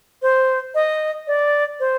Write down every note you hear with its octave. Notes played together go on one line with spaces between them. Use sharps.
C5
D#5
D5
C5